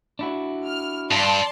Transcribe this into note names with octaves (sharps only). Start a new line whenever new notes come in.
D4 E4 F#4
F6
G2 D5 A5 C6